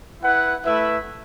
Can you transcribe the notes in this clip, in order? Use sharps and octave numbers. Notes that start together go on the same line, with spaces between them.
E4 B4 F#5
A3 E4 B4 E5